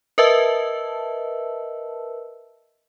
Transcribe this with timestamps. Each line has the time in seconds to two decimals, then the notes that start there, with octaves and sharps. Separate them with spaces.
0.18 A#4 B4 D#5 E5 A5 E6